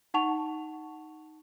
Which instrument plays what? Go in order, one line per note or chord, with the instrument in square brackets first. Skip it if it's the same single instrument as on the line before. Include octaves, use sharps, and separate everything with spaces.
[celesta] D#4 F#5 A5 C#6 F7